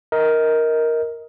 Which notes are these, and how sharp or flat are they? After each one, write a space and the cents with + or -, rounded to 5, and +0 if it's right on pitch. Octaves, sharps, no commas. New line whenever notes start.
A#4 +0 D#5 +25